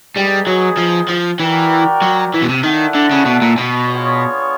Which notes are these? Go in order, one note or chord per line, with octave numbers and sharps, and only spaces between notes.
G3 B3 D#4 G#4
F#3
F3
F3
E3 F#4 A#4 D5 G5
F#3
E3
B2
C3
D#3 E4 A4 D5 F#5
D3
C#3
B2
A#2
B2
B3 D4 F4 G#4 C#5